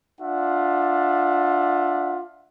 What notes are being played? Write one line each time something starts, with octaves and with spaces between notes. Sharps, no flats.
D4 F4 E5 F#5